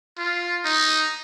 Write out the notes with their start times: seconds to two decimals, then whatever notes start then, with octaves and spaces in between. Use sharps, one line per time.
0.18 F4
0.65 D#4